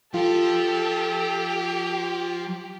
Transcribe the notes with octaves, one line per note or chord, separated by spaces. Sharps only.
F3 F4 G4 A4